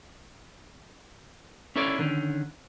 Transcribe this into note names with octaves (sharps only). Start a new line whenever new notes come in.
C#4 E4 A4 A#4 C#5 D5
D3 D#3 C#4